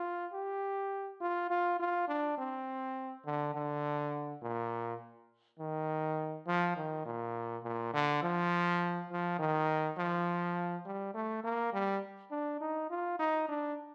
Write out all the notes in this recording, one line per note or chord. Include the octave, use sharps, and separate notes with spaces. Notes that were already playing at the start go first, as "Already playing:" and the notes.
Already playing: F4
G4
F4
F4
F4
D4
C4
D3
D3
A#2
D#3
F3
D#3
A#2
A#2
D3
F3
F3
D#3
F3
G3
A3
A#3
G3
D4
D#4
F4
D#4
D4